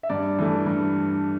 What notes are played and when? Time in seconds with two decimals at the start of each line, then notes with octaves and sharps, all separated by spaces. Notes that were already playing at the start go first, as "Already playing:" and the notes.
0.03 E5
0.09 G2 D5
0.39 E3 A3
0.66 G2